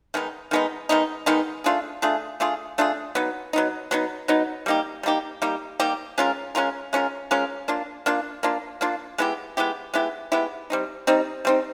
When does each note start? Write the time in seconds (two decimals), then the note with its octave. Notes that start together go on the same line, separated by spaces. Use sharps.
0.14 D#3 G#3 B3 D#4
0.51 D#3 G#3 B3 D#4
0.89 D#3 G#3 B3 D#4
1.26 D#3 G#3 B3 D#4
1.64 A3 D4 F4 G#4
2.02 A3 D4 F4 G#4
2.40 A3 D4 F4 G#4
2.78 A3 D4 F4 G#4
3.15 F#3 B3 D#4
3.53 F#3 B3 D#4
3.91 F#3 B3 D#4
4.28 F#3 B3 D#4
4.66 G3 A#3 D#4 G4
5.03 G3 A#3 D#4 G4
5.42 G3 A#3 D#4 G4
5.80 G3 A#3 D#4 G4
6.18 G#3 C#4 F4 A#4
6.55 G#3 C#4 F4 A#4
6.93 G#3 C#4 F4 A#4
7.31 G#3 C#4 F4 A#4
7.68 A#3 D4 F4
8.06 A#3 D4 F4
8.43 A#3 D4 F4
8.81 A#3 D4 F4
9.18 G#3 B3 E4 G4
9.57 G#3 B3 E4 G4
9.94 G#3 B3 E4 G4
10.32 G#3 B3 E4 G4
10.70 G3 C4 D#4
11.07 G3 C4 D#4
11.45 G3 C4 D#4